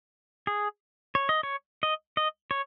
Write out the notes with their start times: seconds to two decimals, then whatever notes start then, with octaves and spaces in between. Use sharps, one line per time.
0.47 G#4
1.15 C#5
1.29 D#5
1.43 C#5
1.83 D#5
2.17 D#5
2.51 C#5